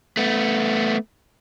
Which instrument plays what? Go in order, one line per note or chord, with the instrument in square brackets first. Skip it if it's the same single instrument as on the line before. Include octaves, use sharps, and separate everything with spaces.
[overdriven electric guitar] A3 B3